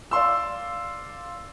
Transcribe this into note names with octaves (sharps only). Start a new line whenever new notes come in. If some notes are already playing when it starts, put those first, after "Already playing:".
D5 F5 C6 E6